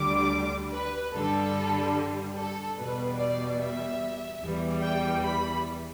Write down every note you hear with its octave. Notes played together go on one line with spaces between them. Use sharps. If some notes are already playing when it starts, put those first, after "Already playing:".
Already playing: D2 D3 G3 D6
B4
G2 D3 G3 A4
A4
E2 B2 G3 B4
D5
E5
E2 E3 G3
G5
B5